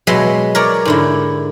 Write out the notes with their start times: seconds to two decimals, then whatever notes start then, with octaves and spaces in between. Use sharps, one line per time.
0.07 B2 F#3 G#3 E5 F#5 C6
0.55 A#4 C#5 D5
0.85 G#2 D3 E4